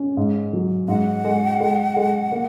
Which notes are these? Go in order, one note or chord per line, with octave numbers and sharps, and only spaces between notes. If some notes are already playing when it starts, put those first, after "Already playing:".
Already playing: C#4
G#2
F#3
G#2 F#5
G#3
G#3
G#3
A#3